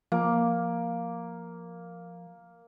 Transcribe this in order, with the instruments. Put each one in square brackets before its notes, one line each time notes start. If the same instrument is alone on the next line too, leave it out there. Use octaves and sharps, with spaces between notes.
[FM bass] F3 [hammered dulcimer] A#3